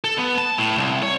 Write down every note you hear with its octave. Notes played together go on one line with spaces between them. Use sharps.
A4
B3
A5
A2
C2
C#5